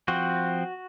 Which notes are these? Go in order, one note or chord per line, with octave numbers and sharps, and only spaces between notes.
F3 C4 F#4